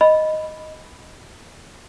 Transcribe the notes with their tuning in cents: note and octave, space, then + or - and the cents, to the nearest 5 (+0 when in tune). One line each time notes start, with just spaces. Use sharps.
D#5 +0 B5 +0